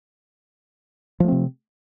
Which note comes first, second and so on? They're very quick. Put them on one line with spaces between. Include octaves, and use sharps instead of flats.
F3 A3 C4 C3